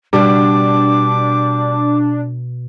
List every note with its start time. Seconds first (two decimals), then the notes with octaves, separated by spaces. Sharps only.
0.13 B2 G3 D4 D6